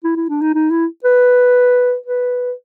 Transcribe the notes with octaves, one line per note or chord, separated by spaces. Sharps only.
E4
E4
D4
D#4
D#4
E4
B4
B4